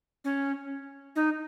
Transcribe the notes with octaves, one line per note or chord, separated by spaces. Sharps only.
C#4
D#4